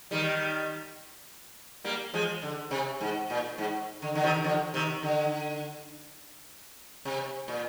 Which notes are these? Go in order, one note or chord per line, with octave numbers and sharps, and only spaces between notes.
D#3 G3
G3 A#3
F3 G#3
D3
C3
G#2
A#2
G#2
D3
D3
C3 D#3
D3 F3
C3 D#3
D3
C3
A#2